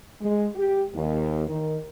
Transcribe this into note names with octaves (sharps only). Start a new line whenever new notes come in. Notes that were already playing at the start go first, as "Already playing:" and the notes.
G#3
G4
D#2
D#3